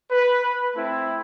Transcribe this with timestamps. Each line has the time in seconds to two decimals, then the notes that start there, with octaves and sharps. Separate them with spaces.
0.11 B4
0.74 A3 C4 E4